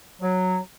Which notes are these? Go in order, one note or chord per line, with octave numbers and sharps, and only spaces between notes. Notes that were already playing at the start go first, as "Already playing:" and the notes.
F#3